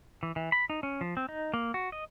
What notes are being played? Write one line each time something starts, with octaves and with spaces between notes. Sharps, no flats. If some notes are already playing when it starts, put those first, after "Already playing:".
E3
E3
B5
D#4
C#4
F3
C4
D#4
A#3
F#4
D#5